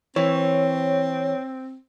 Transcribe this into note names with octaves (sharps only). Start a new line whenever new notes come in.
E3 C4 C#5